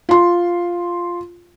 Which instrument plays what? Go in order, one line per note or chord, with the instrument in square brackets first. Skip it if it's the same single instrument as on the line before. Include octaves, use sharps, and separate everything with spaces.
[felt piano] F4 C6